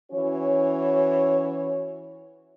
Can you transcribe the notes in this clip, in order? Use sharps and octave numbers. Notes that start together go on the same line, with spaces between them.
E3 C#4 F#4 C#5